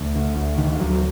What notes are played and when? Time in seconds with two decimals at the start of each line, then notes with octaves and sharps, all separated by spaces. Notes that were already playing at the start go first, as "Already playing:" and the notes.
Already playing: D2
0.15 D3
0.37 D2
0.58 D3 D#3
0.79 D2 F#3